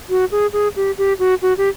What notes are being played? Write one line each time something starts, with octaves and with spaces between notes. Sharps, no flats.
F#4
G#4
G#4
G4
G4
F#4
F#4
G4